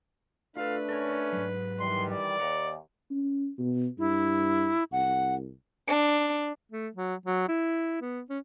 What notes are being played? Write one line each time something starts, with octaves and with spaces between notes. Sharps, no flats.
A3 D4 F4 A4 B4 F5
C#4 A4 A#4 C#5
G#2 F#3
D#3 E3 G3 C6
D5
D#2 F#5 A#5
C#4
B2
G2 E4
C2 F#5
D4
A3
F#3
F#3
E4
B3
C#4